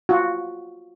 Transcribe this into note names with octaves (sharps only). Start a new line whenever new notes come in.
F4 F#4